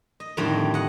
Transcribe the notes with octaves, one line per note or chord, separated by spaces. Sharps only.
D#5
F2 A2 D3 D#3 G3
D#5 F#5